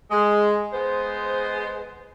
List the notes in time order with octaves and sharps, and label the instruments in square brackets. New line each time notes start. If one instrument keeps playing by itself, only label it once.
[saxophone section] G#3
G#3 B3 C5